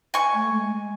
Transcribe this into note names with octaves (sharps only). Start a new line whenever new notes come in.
G#5 C#6
A3
G#3